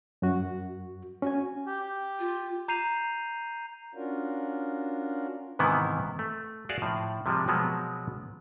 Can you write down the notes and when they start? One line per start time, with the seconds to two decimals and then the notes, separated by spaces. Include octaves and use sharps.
0.22 F#2 F#4
1.22 C#4 F#4 G#5
1.67 G4
2.20 F4
2.68 A#5 G6 C7 D#7 F7
3.95 C#4 D4 F4 F#4 A#4
5.59 G#2 C3 D#3 E3 B3 E4
6.19 A3
6.69 F#4 G#4 D5 E5 F5
6.82 A2 F3
7.26 C3 F3 G3 G#3
7.48 B2 F3 F#3 G#3 B3